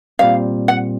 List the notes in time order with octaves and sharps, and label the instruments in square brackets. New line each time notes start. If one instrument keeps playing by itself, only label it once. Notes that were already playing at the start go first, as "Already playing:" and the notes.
[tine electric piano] A#2 G3 C4 [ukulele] F5
[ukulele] F#5